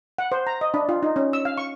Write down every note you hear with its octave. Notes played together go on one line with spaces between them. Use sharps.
F#5
C5
A#5
D#5
D4
F4
D#4
C#4
E6
F5
C#6